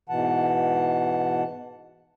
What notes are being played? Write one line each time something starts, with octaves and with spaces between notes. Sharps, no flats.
G#2 B2 E3 F#5 A5